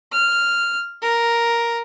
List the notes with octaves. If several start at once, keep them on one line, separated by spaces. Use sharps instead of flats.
F6
A#4